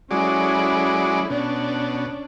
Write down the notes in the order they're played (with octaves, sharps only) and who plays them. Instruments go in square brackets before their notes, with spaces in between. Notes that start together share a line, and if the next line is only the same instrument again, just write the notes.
[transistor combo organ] F#3 G#3 D5 [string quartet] C#4 E4 A4
[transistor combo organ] B2 [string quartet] C#4 D4